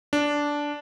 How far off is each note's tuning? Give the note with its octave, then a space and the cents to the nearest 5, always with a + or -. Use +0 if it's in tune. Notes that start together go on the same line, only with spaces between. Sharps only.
D4 -10